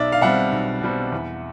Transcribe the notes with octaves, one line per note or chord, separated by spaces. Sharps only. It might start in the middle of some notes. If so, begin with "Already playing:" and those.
Already playing: B1 D5 E5
F5
B2 G3 C4 E5 F#5
B1
B2 G3 C4
E2